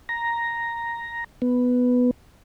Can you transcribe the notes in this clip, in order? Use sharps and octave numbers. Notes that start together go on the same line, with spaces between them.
A#5
B3